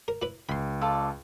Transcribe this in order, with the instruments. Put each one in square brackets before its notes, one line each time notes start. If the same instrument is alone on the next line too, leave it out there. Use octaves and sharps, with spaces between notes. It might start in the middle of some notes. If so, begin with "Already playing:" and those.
[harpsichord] A#4
E4 B4
[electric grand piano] C#2 [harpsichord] B5 C6
[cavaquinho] F4 A4 D5